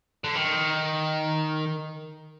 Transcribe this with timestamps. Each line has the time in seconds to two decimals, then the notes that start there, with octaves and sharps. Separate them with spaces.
0.24 D3
0.35 D#3